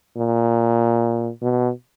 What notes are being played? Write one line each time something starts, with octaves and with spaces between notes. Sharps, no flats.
A#2
B2